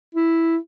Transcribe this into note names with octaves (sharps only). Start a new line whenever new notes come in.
E4